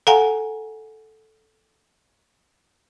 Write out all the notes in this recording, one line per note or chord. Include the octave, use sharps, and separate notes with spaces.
A4 F5 F#5 G#5 A#5